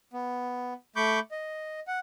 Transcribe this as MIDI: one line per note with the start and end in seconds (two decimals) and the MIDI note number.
0.13 0.74 59
0.96 1.19 57
0.96 1.19 83
0.96 1.19 85
0.96 1.19 86
0.96 1.19 91
1.31 1.80 75
1.87 1.99 78